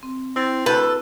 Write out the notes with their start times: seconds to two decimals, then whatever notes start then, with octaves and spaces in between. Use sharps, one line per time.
0.03 C4
0.36 C4 E4 A6
0.66 D2 A4 B4 F#6 G6 A6